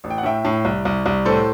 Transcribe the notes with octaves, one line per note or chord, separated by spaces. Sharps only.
A1
G5
F#5
A2 E5 G5
A2
C2
C2
C2
A2 A4 C5